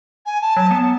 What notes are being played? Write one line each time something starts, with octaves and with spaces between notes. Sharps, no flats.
G#5
A5
F#3
B3